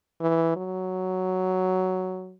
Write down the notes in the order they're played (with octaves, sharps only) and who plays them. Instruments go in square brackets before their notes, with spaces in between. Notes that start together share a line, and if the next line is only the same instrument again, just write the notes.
[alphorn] E3
F#3